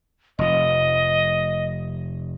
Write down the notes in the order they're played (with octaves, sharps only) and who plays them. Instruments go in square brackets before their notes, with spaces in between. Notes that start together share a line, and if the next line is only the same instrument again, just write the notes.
[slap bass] F1 F3 [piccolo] D#5